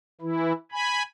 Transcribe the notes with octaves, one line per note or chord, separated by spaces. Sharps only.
E3 E4
G#5 B5